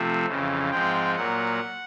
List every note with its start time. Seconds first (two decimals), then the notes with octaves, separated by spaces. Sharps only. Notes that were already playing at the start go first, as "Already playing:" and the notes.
Already playing: C3 F3 A3 C4
0.26 F2 C#3 E3
0.70 G#2 F3 G#3 C4 G5
1.15 A#2 F#3 A#3 F#5